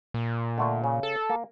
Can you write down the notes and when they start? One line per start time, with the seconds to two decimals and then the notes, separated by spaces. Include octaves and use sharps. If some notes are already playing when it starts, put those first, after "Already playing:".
0.14 A#2
0.58 D3 A3 D4
0.84 C#3
1.03 A4
1.30 A#3